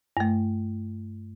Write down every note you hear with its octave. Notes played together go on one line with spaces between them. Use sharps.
G2 A3